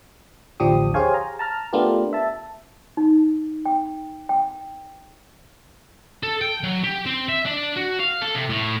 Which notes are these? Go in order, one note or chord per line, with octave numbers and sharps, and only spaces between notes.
A1 D2 F3 D4 G4 D#6
G4 G#4 C5 C#5 F5 G#5
A#5
A5 A#5 F6
A3 B3 D4 F4 G4 A#4
E5 A5
D#4
G5
G5
A4
G5
F#3
G4
C4
E5
D4
F#4
F5
A4
C3
A2